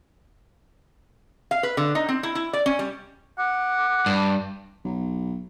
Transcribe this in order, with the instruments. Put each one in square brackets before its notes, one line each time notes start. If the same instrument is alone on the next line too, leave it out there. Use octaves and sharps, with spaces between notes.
[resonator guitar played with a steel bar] F5
B4
D3
D#4
C4
E4
E4
D5
C#4
G3
[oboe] F#5 [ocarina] D6
[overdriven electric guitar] G2
[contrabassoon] B1